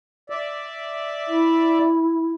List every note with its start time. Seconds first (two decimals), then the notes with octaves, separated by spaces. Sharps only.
0.30 D5 E5
1.28 E4